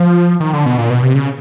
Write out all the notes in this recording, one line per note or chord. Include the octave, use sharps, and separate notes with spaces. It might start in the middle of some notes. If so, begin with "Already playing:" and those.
Already playing: F3
D#3
D3
B2
A#2
B2
C3
C#3